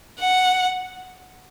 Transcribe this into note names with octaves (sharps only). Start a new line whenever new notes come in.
F#5